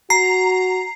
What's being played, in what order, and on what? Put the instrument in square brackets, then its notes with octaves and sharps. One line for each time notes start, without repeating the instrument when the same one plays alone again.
[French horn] F#4 [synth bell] A#5 [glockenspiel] C7